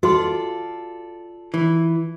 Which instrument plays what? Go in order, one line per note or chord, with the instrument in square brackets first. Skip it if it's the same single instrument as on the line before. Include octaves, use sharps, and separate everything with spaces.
[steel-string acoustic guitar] F4 A4 D5 [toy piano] F#4 C6
[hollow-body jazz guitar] E3